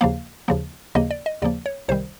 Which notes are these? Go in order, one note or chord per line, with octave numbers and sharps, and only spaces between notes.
D#2 C#3 F3 A#3 F5
D#2 C#3 F3 A#3
D#2 C#3 F3 A#3 D#5
D5
D#5
D#2 C#3 F3 A#3 D5
C#5
C2 C3 D#3 G3 C5